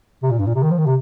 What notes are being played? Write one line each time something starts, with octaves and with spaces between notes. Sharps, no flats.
C3
A#2
G2
A#2
C3
D#3
F3
D#3
C3